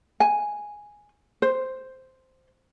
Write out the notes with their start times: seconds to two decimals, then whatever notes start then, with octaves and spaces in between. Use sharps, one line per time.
0.20 G#5
1.42 C5